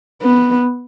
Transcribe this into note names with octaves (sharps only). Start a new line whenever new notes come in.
B3